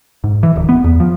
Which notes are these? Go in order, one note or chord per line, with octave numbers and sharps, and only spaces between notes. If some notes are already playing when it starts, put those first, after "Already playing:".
G#2
E3
D1
B3
E2
F3